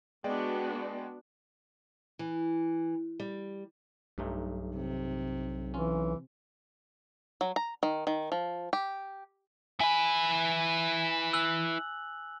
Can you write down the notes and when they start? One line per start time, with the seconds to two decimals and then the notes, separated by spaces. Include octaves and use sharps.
0.24 G#3 B3 D4 F#4 D5 G5
2.19 E3
3.20 G3
4.18 B1 G2 A3 D#4
4.76 C3
5.74 E3 C#4 F4
7.41 F#3
7.56 A#5
7.83 D#3
8.07 D#3
8.32 F3
8.73 G4
9.80 E4 B4 G#5
11.33 E6 F#6 F#7